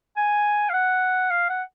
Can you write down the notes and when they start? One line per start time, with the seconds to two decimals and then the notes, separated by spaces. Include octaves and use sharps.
0.17 G#5
0.69 F5
0.73 F#5
1.30 F5
1.49 F#5